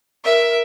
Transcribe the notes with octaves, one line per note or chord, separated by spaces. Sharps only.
A#4 E5